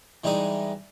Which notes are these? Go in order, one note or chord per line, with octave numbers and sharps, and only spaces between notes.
E3 G3 G#3 D#4 D#5